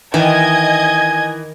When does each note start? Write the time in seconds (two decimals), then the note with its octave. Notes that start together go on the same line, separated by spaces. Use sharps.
0.14 D#3 E3 D#5 G#5 G#6